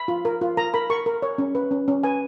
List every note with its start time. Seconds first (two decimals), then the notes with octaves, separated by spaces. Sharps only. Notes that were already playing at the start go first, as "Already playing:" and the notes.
Already playing: B5
0.08 F4
0.25 A#4
0.41 F4
0.57 A#4 A#5
0.74 A#4 B5
0.90 A#4 C#6
1.06 A#4
1.22 C#5
1.38 C#4
1.55 B4
1.71 C#4
1.88 C#4
2.03 B4 G#5